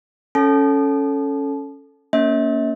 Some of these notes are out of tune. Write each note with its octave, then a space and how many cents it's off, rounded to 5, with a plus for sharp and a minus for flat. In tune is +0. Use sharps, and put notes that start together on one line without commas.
C#4 +0 A4 +0 A5 -30
A#3 +0 C#4 +25 E5 -45